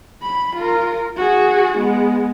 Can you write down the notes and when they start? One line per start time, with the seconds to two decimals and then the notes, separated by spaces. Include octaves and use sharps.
0.22 B5
0.55 F4 A#4
1.17 F#4 G#4
1.78 G#3 B3